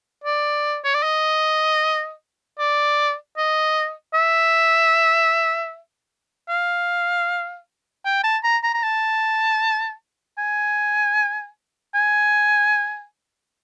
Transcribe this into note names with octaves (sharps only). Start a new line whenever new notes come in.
D5
C#5
D5
D#5
D5
D#5
E5
F5
G5
A5
A#5
A#5
A#5
A5
G#5
G#5